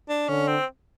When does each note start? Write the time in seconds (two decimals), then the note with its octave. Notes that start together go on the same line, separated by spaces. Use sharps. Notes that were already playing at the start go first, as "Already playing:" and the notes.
0.09 D4
0.28 D3 C#4
0.48 C4